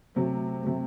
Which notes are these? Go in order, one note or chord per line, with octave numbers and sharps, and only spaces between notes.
C3 F#3 A3
C3 F#3 A3